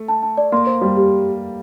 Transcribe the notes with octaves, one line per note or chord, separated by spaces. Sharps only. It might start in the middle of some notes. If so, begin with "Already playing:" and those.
Already playing: A3
A5
A5
D5
A#3 C6
C5
G3 C6
G4